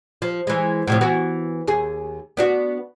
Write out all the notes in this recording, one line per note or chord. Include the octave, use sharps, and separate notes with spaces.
F3
E3 G#3
A2 C3 F3
E3 B3 F#4
D#2 G#4
B3 D4 F#4